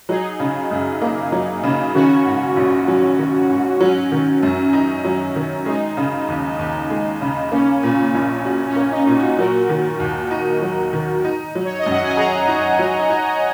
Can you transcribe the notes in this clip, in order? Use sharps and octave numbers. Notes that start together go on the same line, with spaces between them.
F#3 D#4 G#4
C#3
F#2
A#3
F#3
C#3
D#3 C#4 F#4
G#2
A#1
F#3
D#3
G#2
F#3 C#4
D#3
F#2
D#4
F#3
D#3
G#3 D#4
C#3
D#2
D#2
G#3
C#3
A#3 C#4
A#2
A#1
F#4
C#4
A#3
D#4
A#2
C#4 F#4
F#3 F#4 A#4
D#3
D#2
D#4
F#3
D#3
D#4
F#3
C#5
D#5
F#2
F#5
G#5
G#4 F#5 A#5
D#4
F#3
D#4